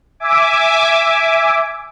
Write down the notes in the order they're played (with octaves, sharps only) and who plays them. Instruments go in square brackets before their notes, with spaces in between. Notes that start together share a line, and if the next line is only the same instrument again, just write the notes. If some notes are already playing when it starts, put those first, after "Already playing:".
[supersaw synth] E5 G#5 D6